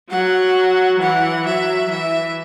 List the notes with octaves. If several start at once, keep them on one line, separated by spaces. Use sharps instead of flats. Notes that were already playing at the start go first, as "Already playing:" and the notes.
F#3 F#5
E3 F#5
F#3 E5
E3 E5